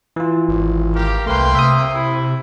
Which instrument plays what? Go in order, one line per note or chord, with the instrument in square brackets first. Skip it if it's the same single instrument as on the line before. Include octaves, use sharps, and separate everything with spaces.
[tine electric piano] E3 F4
[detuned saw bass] G#1
[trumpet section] G4 A#4 F5
[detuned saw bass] C2 [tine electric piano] A3 A#4 B4 [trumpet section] A#3 G5 C6
[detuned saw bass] C3 [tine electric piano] E5 D#6
[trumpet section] E4